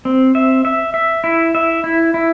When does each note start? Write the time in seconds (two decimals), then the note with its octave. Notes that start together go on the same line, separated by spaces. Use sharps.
0.05 C4
0.35 E5
0.65 E5
0.94 E5
1.24 E4
1.55 E5
1.84 E4
2.14 E4